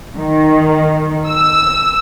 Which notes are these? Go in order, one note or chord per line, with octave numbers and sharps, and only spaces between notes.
D#3
E6